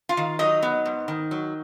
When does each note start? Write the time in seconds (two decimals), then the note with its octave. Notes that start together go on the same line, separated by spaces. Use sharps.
0.09 F4 F5
0.17 D#3
0.39 F#3 D#4 D#5
0.62 B3
0.85 G#2
1.08 D#3
1.31 F#3